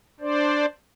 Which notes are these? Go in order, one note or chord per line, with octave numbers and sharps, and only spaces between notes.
D4 C5 D5